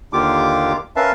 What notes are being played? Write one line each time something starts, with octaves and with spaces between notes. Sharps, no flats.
D#2 D3 A#3 F4 G4 D6
C#4 A#4 B4 E5 F5 A5